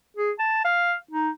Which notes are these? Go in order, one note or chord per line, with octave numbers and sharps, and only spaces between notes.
G#4
A5
F5
D#4